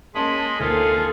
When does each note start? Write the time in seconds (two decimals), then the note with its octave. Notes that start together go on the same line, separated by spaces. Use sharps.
0.15 G#3 A#3 C#4 G#4 D#5 A5 B5 C6
0.60 D2 D#3 A#3 F4 G#4 A4 C5 A5